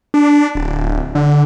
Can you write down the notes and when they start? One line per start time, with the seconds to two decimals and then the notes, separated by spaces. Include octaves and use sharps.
0.14 D4
0.55 D1
1.15 D3